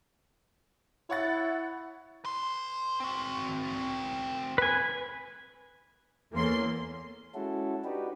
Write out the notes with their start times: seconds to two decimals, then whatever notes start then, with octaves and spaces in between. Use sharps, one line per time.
1.10 E4 C#5 F#5 A6
2.25 B4 C6
3.00 C4 F#4
4.58 B4 G#5
6.33 E2 A#3 C#4 A4 C6
7.35 G#3 C#4 E4 F#4 A4
7.84 D4 D#4 F#4 G4 B4